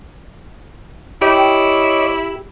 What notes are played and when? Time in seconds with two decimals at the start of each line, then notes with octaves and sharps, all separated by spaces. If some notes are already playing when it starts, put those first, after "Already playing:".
1.22 E4 G4 C#5 D#5 D6